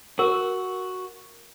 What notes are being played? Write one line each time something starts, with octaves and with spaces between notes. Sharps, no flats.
F#4 A#4